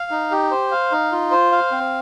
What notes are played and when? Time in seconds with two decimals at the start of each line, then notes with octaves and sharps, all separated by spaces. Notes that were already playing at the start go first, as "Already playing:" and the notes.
Already playing: F5
0.11 D#4
0.31 G4
0.51 C5
0.71 F5
0.92 D#4
1.12 F4
1.31 C5
1.52 F5
1.72 C4